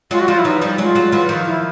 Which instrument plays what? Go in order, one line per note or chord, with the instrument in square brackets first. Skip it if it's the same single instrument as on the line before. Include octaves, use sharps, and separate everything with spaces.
[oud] F#3 G#3 [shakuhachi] F4
[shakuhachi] F#4
[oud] F3 G3 [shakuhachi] F4
[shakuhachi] E4
[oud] E3 F#3 [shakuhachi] D#4
[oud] F3 G3
[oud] F#3 G#3 [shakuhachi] F4
[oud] F#3 G#3
E3 F#3
D#3 F3
[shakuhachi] E4